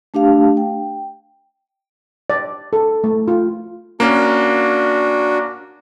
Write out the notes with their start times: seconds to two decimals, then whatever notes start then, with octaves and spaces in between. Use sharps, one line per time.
0.14 A3 D4 G4 F5 A5
0.57 G5
2.30 D5
2.73 A4
3.04 A3
3.28 F4
4.00 A#3 C#4 D4 F#4